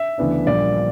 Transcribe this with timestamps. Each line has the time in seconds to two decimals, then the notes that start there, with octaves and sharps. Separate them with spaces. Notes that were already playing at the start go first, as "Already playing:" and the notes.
Already playing: E5
0.18 D2 C#3 E3 B3 D4
0.46 A#1 A#2 G3 A#3 D5